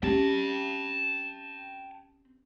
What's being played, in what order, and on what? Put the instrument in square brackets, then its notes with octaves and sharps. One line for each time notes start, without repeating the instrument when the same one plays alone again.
[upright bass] C4 [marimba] C#4 G4 [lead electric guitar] G5 A5